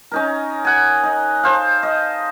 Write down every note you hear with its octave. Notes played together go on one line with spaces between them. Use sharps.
C#4 D#4 A#4
F#5 G#5
D#4
A4 C5 F5
D#5